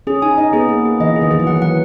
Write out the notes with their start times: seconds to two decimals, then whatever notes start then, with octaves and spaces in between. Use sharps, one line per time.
0.07 C#4 G#4
0.22 D#4 G#5
0.37 D#4 D#5
0.53 B3 G#4
0.68 A#3 G#4
0.85 G#4
1.00 E3 D#5
1.16 G#4
1.22 D#3
1.31 E3 G#4
1.40 F#3
1.47 E3 F#5
1.56 F#3
1.62 E3 F#5